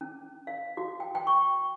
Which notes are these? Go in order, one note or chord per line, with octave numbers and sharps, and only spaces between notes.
C#4
F5
F#4
G5
G5
C#6